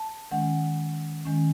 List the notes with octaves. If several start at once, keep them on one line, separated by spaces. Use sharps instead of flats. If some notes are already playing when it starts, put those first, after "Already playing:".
Already playing: A5
D#3 G#3 C#4 F#5
D#3 G#3 C#4